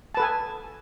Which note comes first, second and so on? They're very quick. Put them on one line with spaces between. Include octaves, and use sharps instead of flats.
A5 B4 A4 G#5